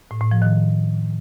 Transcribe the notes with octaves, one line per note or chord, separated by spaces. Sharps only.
A2
A2
F3
D#3